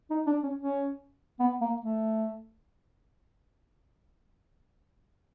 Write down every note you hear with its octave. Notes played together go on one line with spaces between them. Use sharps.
D#4
D4
C#4
C#4
B3
A#3
A3